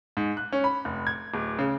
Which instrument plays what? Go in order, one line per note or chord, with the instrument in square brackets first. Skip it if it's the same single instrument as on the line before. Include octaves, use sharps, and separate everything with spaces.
[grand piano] G#2
F#6
C#4
B5
F1
G#6
D1
C#3